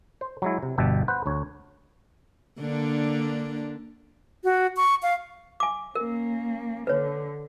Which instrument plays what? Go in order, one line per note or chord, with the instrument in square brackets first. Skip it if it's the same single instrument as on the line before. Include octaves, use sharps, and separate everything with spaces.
[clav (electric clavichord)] C5
F#3 G#3 E4
C3
G1 B2 G4 E5 A5
B4 C5 F#5
D2 C#5
[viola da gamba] D3 A#3 D4
[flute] F#4
C#6
F5
[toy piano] G#5 D6
[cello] A#3 C#4 [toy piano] A#4
[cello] D3 [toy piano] B4 C#5